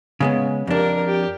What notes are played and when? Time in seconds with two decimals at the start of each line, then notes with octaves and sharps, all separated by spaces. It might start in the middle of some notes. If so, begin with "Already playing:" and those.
0.20 C#3 G#3 B3
0.67 F2 D4 G4 A#4
1.07 G4